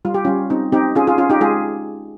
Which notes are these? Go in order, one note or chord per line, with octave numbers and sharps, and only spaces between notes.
G3 F4
G4
G3 C#4 F4
C4 D#4
C4 D#4 G4
C#4 F4 G#4
F4 G#4
C#4 F4
D#4 G4
G#3 F4 G#4